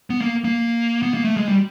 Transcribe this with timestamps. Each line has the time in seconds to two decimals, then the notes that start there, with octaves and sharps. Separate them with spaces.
0.10 B3
0.21 A#3
0.44 A#3
1.03 B3
1.14 A#3
1.25 A3
1.37 G#3
1.48 G3